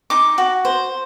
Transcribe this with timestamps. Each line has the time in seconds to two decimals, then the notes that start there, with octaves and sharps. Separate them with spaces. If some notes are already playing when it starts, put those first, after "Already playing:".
0.10 D#4 D6
0.38 F#4
0.65 C5